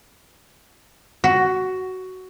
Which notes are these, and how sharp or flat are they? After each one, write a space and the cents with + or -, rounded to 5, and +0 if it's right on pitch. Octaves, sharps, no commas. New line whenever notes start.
F#4 +10